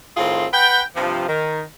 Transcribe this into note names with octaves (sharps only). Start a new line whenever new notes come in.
A2 D#3 C4 F4 G#4
B4 F#5 G5
G2 C3 F3
D#3